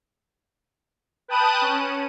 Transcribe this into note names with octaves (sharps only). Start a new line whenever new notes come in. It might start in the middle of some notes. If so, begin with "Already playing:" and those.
B4 G5 A5 D#6 F#6 D#7
C#4